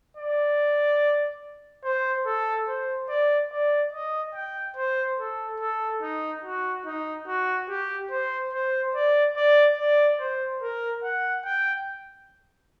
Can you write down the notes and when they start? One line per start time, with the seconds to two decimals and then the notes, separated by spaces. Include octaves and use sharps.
0.17 D5
1.84 C5
2.26 A4
2.68 C5
3.09 D5
3.52 D5
3.93 D#5
4.35 G5
4.76 C5
5.18 A4
5.60 A4
6.02 D#4
6.44 F#4
6.86 D#4
7.27 F#4
7.69 G4
8.11 C5
8.53 C5
8.95 D5
9.36 D5
9.78 D5
10.20 C5
10.62 A#4
11.04 F#5
11.45 G5